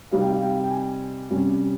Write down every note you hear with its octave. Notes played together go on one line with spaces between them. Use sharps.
C3 G3 C4 D#4 F5
G5
F5
G5
G5
G#5
C3 G3 C#4